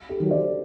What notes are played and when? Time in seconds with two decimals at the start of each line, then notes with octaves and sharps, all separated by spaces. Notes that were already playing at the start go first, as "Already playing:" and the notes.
0.09 G4 A4
0.20 D#3 F#3
0.31 C5 D5